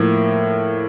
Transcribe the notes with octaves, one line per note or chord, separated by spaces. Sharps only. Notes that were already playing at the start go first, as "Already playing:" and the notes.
Already playing: A2 F3 A#3